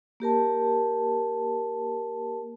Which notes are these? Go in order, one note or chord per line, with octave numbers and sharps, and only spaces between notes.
A#3 G4 A#4 A5